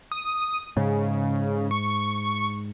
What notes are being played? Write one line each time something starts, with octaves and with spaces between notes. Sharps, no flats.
D#6
G#2 C#3
C#6